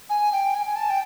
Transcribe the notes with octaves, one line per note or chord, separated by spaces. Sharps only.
G#5
G5
G#5
G#5
A5
G5